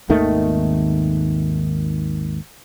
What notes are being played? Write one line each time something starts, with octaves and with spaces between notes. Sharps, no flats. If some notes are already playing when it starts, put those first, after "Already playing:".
G#1 D#2 D#3 A3